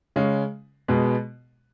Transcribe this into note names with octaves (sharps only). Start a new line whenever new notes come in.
C#3 G#3 C#4
B2 G#3 B3